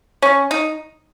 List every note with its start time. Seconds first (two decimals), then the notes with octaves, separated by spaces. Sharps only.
0.22 C#4
0.51 D#4